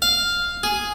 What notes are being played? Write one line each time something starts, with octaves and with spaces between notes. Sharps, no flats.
F5
G#4